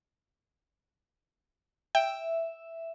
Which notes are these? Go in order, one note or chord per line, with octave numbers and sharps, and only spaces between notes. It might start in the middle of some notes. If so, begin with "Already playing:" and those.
E5 G5